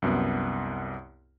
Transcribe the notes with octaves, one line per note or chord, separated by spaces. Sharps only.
C2 F#2 B3